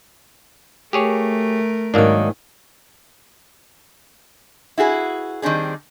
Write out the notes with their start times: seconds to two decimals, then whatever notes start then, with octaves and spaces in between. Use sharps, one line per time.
0.93 A3 G4 G#4 A#4 C#5
1.94 G#2 D#3 F#3 A#3 D4
4.78 E4 F#4 G#4 A4 B4
5.42 D#3 G3 C4 D4 G#4